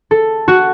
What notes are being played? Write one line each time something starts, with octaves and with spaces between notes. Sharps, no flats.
A4
F#4